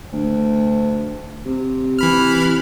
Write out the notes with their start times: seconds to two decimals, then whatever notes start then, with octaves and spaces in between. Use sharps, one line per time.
0.13 D2
1.46 C3
1.99 E3 B5 F6